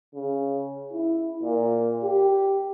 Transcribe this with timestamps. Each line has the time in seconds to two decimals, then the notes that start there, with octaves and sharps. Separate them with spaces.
0.15 C#3
0.93 E4
1.43 A#2
2.04 G4